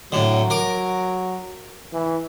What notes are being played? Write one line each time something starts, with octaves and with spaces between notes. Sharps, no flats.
A2 D3 F#3
A#4 D6
E3